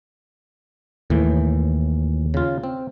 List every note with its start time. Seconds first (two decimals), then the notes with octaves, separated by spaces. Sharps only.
1.10 D#2 A2 E3
2.34 C#3 F4
2.64 C4